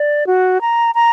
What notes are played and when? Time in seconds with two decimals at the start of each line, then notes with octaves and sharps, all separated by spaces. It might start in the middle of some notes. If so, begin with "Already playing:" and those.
Already playing: D5
0.27 F#4
0.61 A#5
0.95 A#5